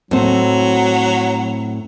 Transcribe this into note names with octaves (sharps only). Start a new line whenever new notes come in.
A2 F#3 C4